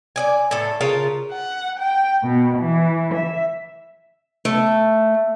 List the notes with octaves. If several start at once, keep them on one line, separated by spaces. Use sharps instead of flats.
D5 D#5 G#5
A2 A4
C#3 F4 A#4 A5
F#5
G5
B2
E3
E5
A3